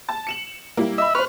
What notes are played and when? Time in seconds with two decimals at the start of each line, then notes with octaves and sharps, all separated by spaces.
0.09 A5
0.27 C#7 E7 F#7
0.77 G3 A#3 E4
0.98 D#5 E5 B5
1.15 B4 C5 C#6 F6